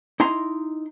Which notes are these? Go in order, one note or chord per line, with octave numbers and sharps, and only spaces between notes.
D#4 E4 A#5 C6